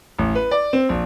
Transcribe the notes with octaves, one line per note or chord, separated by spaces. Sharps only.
A1
B4
D5
C4
A#1